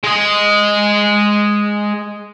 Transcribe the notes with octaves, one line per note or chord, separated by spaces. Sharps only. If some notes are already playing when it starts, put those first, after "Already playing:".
G#3 D#5